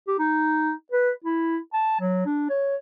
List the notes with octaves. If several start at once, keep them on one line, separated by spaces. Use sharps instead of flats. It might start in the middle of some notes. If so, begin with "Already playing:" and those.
G4
D#4
B4
E4
A5
F#3
D4
C#5